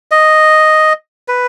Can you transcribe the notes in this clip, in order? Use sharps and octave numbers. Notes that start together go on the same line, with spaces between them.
D#5
B4